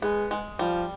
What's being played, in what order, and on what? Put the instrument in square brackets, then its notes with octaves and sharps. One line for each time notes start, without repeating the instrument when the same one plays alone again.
[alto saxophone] G#3 [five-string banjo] B3
[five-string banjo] G#3
[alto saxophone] F3 [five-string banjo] G3